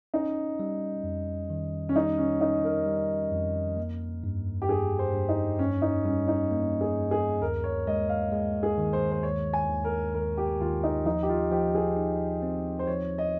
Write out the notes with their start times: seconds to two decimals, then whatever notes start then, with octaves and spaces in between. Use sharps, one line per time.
0.14 C#4 D#4
0.59 G3
1.04 F2
1.50 D#3
1.89 C#4
1.95 G3 D#4
2.18 C#4
2.41 C#4 D#4
2.64 A#4
2.86 G3
3.32 F2
3.77 A#3
4.24 G2
4.62 G4
4.68 G2 G#4
4.99 C5
5.13 G2
5.29 D#4
5.59 G2 C#4
5.82 D#4
6.05 G3 C#4
6.28 D#4
6.51 A#3
6.81 G#4
6.96 G2
7.11 G#4
7.42 D#2 A#4
7.64 C#5
7.87 G#3 D#5
8.09 F5
8.32 G#3
8.63 G#4
8.78 D#3
8.93 C5
9.12 C5
9.23 D#2 C#5
9.53 G#5
9.69 D#2
9.84 A#4
10.14 D#2 A#4
10.37 G4
10.60 D#2 F4
10.83 D#4
11.05 F3 D#4
11.23 G4
11.29 F4
11.51 F3 G4
11.75 G#4
11.97 D#4
12.43 C4
12.79 C5
12.87 F3 C#5
13.18 D#5